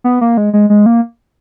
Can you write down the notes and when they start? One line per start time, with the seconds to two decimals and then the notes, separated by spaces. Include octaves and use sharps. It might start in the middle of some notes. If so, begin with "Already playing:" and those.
0.04 B3
0.21 A#3
0.37 G#3
0.53 G#3
0.70 G#3
0.86 A#3